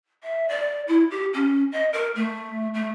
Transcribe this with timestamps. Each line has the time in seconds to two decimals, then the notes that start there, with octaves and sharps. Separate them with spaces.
0.23 E5
0.49 D5
0.88 E4
1.11 G4
1.34 C#4
1.72 D#5
1.93 A#4
2.15 A3
2.74 A3